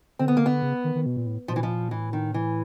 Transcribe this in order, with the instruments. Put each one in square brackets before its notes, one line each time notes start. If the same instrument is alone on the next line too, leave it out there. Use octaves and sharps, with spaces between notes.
[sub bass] D3 [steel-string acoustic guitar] C4
[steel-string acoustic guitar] B3
A#3
B3
[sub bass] C#3
D#3
D#3
B2
A#2
A2
[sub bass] A#2 [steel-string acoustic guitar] F3
[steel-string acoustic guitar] E3
F3
[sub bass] A2 [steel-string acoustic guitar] E3
[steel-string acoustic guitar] D#3
E3